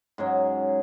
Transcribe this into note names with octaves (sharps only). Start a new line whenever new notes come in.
G#2 C#3 F#3